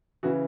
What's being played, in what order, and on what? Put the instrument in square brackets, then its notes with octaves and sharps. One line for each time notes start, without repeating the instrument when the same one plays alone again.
[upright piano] C#3 E3 F#4